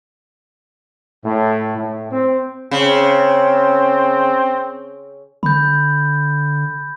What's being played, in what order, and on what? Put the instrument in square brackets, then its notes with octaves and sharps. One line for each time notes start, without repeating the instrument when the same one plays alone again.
[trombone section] A2
A2
C4
[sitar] C#3 [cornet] C4
[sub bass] D3 [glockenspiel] B5 G6